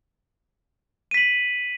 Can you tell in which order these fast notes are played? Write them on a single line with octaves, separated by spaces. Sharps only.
D#7 B6 F#7